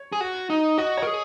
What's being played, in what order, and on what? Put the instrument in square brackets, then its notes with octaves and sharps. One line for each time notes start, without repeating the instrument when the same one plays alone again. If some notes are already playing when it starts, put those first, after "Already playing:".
Already playing: [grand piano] C#5
[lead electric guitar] G#4
F#4
D#4
[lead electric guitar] F#4 [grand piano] D#5
[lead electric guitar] A#4 [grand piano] C#5
[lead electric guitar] G#4